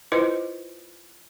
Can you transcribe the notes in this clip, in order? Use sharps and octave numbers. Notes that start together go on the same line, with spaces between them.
E4 F4 B4 C5 D#5